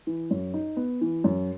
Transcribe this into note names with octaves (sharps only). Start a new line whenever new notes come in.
E3
F#2
D#4
B3
E3
F#2